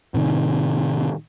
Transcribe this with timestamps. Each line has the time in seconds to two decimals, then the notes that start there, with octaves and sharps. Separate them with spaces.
0.14 A2 C3 D#3